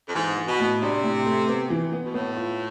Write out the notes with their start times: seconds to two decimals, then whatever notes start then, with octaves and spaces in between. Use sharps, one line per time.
0.08 F2
0.15 G#2 E3
0.37 E3
0.48 B2
0.60 A2
0.82 C3 D4
1.03 A2
1.26 A3
1.48 B3
1.70 E3
1.93 B3
2.04 B2
2.14 A2 B3
2.37 F4